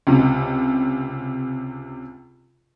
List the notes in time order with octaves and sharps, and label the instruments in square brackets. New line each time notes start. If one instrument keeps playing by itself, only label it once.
[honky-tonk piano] C#2 C3